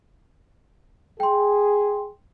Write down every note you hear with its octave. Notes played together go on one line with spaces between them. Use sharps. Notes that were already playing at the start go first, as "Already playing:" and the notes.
G#4 G5 C6